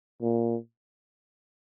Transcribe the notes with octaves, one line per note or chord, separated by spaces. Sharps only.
A#2